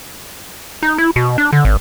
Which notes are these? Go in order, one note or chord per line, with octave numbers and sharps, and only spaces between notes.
D#4
E4
B2
D4
D3
G#1